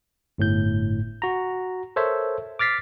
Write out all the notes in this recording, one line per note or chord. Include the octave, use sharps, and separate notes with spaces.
G1 A2 G6
F#4 A#5
A4 A#4 C5 C#5 E5
D6 F6 A6 B6 C7